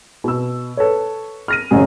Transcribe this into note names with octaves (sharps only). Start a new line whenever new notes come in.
B2 E6
A4 B4 C#5
F6 A#6 D#7
A1 F#2 C#3 C4 G#4